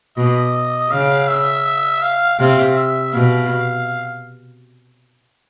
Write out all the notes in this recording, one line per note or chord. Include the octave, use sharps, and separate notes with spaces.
B2 D#5
C#3 F5
E5
F5
C3 F5
E5
B2 F5